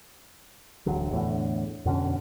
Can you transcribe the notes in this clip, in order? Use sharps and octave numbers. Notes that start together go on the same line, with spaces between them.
D1 A1 D3 F#3
E2 A2 D3
F2 B2 D3 C#4